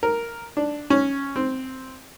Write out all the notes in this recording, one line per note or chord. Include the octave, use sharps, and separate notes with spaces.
A#4
D4
C#4
C4